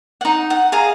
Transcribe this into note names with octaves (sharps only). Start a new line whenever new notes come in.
D#4 F#5
F#5
G#4 D#5 F5 A#5